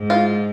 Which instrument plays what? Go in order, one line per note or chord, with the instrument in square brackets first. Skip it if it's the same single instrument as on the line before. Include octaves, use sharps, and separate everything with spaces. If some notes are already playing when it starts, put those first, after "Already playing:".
Already playing: [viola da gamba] G#2
[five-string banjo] F4